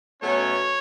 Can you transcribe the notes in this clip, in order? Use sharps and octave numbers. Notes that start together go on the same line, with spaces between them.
B2 F#3 A3 C#4 C#5